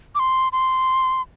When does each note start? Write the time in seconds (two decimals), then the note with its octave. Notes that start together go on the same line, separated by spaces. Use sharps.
0.15 D6
0.19 C6
0.53 C6